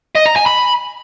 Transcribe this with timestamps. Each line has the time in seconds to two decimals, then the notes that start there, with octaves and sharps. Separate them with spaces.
0.15 D#5
0.26 A#5
0.36 G#5
0.46 B5